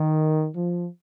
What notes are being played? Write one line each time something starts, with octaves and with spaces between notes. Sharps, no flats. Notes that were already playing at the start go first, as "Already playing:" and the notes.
Already playing: D#3
F3